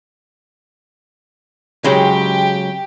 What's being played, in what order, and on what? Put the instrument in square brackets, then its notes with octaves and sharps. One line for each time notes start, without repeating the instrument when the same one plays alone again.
[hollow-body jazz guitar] C#3 F#3 G#3 [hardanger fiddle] G4 G5